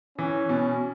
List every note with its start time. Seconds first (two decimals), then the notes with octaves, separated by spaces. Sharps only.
0.18 E3 C#4
0.49 B2